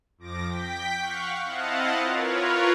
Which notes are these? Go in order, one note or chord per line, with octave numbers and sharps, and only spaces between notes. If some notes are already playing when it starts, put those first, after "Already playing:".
F2 F3 D6 A#6
G5 B6
F5 F#5 C#6
C4 E4 D#5 F5 F#5 A5
F4 A#4 B4 C#5